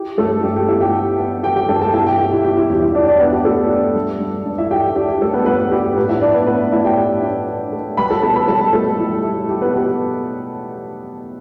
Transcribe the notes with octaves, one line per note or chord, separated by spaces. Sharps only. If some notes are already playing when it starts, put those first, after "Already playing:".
Already playing: E4 G4
G2 A3 A4
G2 G4
G4
B3 E4 E5
G4 G5
E4
B3
B3 G4 G5
G4 G5
G2 A4 A5
A4 A5
B2 E4 E5
G4 G5
B2 G4
E4
B2 G4
E4
E2 G4
E4 E5
D4 D5
D4 D5
B3 B4
G4
A3 D4 A4
D4
G3
G2
G2
E4 E5
D4 G4 G5
D4 G4
G4
G3 A3 A4
B3 B4
G2 B3 B4
B3 B4
D4 G4
G4
A2 B3 B4
E4 E5
A2 D4 D5
B3 B4
A3 B3 B4
A2 E4 E5
G4 G5
A3
D4
D4
A3
G3 B4 B5
A4 A5
B2 A4 A5
B4 B5
G3 A4 A5
B2 A3 A4
G3 E4
E4
E4 G4
B3 B4
B2 G4